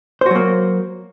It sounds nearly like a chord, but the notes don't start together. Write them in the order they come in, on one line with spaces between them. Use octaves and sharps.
C5 F#4 F#3 A#3